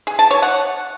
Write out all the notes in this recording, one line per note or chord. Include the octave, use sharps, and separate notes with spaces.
G#4
A5
C#5
F#5